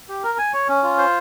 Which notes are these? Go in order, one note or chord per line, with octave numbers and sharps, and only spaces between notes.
G4
A#4
G#5
C#5
C#4
F4
C5